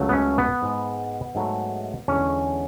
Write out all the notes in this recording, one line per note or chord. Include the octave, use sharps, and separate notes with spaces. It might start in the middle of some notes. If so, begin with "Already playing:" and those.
Already playing: C#2 C#3 F#3 A3
B3
C#4
B3
G#2 G#3
G#2 F#3 A3
E2 D3 G#3 C#4